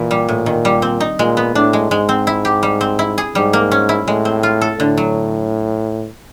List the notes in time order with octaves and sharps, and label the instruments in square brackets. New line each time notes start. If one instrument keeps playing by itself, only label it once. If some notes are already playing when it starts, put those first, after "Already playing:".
Already playing: [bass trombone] A#2 [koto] E3
[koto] G3
A2
D#3
G3
C4
D#4
[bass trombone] A#2 [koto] G#3
[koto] B3
[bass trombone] A2 [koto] D4
[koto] G#3
[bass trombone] G#2 [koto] G#3
[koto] C4
E4
G4
G3
C4
E4
G#4
[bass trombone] G#2 [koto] G3
[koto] A#3
C#4
E4
[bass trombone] A2 [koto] G#3
[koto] C4
F4
A4
[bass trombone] A2 [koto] D3
[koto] F#3